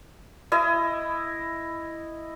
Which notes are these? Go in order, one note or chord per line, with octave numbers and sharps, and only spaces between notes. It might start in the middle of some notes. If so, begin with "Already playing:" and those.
E4 D#5